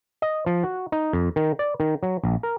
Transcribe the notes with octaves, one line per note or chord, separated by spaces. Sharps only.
D#5
F3
F#4
D#4
F2
D#3
D5
D#3
F#3
A#1
A#4